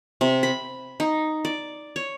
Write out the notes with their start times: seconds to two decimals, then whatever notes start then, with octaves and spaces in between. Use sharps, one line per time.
0.21 C3
0.43 B5
1.00 D#4
1.45 D5
1.96 C#5